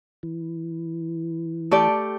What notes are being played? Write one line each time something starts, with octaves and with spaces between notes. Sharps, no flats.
E3
A3 G4 D5